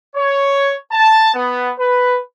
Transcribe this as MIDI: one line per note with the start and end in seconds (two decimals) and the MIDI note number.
0.15 0.73 73
0.91 1.29 81
1.34 1.71 59
1.78 2.18 71